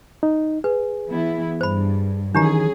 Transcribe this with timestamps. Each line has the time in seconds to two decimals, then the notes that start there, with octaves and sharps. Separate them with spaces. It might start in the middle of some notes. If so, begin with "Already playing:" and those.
0.23 D#4
0.64 G#4 B4
1.08 E3 B3 E4
1.61 G2 C5 B5
2.35 D#3 E3 F#3 C#4 D4 G4 G#4 A#5